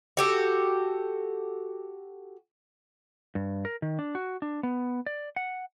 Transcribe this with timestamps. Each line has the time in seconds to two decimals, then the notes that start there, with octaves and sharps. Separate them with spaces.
0.17 F#4 G4 A4
3.35 G2
3.65 A#4
3.82 D#3
3.99 D4
4.15 F#4
4.42 D4
4.63 B3
5.06 D5
5.36 F#5